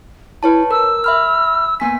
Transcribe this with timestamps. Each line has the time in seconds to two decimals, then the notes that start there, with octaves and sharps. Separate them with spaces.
0.43 E4 B4 C#5 A5
0.71 A#4 E6
1.04 E5 B5 F6
1.80 A#3 B3 G#5 B6